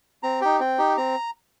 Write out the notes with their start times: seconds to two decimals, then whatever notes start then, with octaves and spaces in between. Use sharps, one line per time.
0.23 C4 A#5
0.41 D#4 G4 G5
0.60 C4 G5
0.78 D#4 G4
0.97 C4 A#5